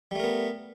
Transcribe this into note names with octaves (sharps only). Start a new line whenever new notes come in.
G3 A3 B3 A#4